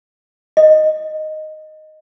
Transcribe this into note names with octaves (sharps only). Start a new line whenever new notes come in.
D#5